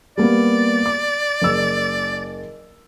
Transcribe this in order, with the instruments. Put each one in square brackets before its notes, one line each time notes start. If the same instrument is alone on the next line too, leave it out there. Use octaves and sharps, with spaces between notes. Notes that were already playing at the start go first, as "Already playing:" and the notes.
[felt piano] G3 A#3 B3 [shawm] D5
[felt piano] D6
F#1 E6